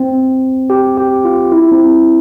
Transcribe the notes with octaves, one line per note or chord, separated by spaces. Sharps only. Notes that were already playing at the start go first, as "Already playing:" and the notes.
Already playing: C4
G4
G4
F4
E4
C4